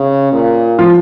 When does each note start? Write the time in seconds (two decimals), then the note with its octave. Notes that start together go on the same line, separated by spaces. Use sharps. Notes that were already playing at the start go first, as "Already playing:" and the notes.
Already playing: C#3
0.32 A#2
0.79 F3 F4